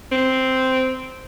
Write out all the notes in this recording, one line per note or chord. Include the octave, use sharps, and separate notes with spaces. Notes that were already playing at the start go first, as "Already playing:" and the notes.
C4